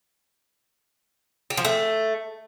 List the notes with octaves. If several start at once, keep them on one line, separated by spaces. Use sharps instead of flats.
G4
F3
A3